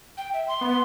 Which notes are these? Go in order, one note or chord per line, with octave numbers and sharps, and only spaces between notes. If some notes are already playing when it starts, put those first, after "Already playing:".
G5
E5
C6
B3